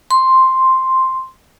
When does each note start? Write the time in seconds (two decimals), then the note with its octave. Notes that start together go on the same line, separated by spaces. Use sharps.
0.11 C6